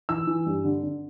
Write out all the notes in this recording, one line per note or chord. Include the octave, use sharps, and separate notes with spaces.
E3 E6
E3
G2
D3
D3